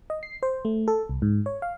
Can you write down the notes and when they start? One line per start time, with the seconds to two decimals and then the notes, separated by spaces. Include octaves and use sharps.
0.10 D#5
0.23 C7
0.43 C5
0.65 A3
0.88 A4
1.09 C2
1.22 G#2
1.46 C#5
1.62 F5